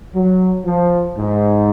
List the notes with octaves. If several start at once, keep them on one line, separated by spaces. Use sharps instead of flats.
F#3
F3
G#2